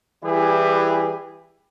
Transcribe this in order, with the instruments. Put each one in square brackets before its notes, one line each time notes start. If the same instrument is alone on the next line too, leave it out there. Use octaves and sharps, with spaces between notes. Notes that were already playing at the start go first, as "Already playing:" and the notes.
[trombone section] E3 G3 E4 G4 G#4 B4